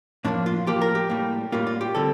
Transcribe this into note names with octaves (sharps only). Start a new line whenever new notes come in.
A2 F3 A#3 D4
F4
A2 F3 A#3 G4
A#4
G4
A2 G3 A#3
A2 G3 A#3 F4
F4
G4
D3 G3 C4 A4